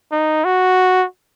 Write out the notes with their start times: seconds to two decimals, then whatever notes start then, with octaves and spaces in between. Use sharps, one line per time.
0.12 D#4
0.45 F#4